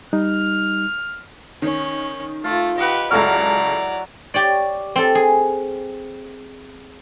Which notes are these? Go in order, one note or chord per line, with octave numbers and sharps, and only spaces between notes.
G3 D#4 F6
D#3 C#4
A3 F4
G4 B4 D#5 F#5
C#2 F#3 E4 A4 D5 A#5 F6
G4 C#5 D5
C4 A4
G#4